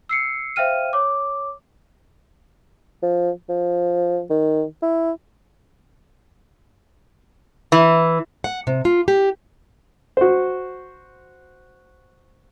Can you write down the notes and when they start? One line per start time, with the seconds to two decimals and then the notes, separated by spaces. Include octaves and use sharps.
0.09 E6 C7 C#7
0.56 C5 E5 F5 G5 F6 D#7
0.93 C#5 D6
3.03 F3
3.49 F3
4.30 D#3
4.82 E4
7.72 E3
8.44 F#5
8.67 C3
8.85 F4
9.08 G4
10.17 F#4 C5